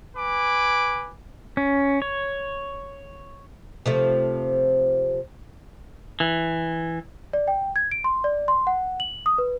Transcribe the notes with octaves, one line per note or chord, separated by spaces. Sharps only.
B4 G#5 D6
C#4
C#5
C3 F3 A3
E3
D5
G5
G#6
D7
C6
D5
C6
F#5
F#7
D#6
B4